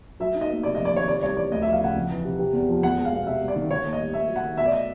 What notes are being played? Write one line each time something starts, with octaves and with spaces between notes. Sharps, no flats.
F#3 E5
D#4
D#5
A#3
C3 D5
D#5
F2
D5
D#3 C#5
C3 D5
C2 C#5
E3 D5
D2 D#5
E5
F3
F5
C#3 F#5
F2
E3
C3
C3
E2
F3
E2 F#5
G#3
F5
B2
C3 E5
G3
D5
D#3
D#3 C#5
D#2
D#5
G3
D#2 E5
F#3
F#5
D#3
B2 E5
D5
D#5